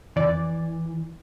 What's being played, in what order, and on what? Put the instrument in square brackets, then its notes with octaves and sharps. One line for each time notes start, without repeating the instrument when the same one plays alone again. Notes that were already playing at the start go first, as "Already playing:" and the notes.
[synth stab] F2 D5 [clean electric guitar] E3